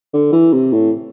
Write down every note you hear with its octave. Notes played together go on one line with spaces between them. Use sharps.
D3
E3
C3
A2